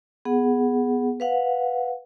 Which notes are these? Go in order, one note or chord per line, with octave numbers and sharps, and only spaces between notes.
B3 G#4 F#5
B4 F5 F#5